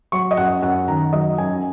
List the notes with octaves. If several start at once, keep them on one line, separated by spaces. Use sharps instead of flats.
F#3 C#6
D#5
F#2 F#5
F#2 F#5
D#3 A#5
F#3 D#5
F#2 G#5